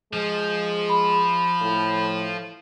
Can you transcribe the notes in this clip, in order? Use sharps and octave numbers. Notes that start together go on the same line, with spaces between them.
F3 G#3
B5
A2